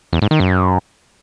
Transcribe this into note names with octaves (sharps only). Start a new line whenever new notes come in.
E2
G#2
D#3
F#2